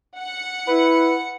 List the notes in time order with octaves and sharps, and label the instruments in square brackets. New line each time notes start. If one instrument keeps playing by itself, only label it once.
[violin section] F#5 C#7
[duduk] E4 [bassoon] B4